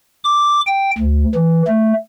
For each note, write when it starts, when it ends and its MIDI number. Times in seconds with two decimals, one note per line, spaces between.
0.24 0.60 86
0.66 0.91 79
0.98 1.24 38
1.35 1.62 52
1.67 1.93 57